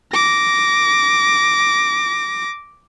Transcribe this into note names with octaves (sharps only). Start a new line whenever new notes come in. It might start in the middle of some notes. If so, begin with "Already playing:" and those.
D6 A#6